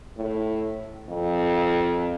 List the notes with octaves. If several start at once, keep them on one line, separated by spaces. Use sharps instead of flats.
A2
F2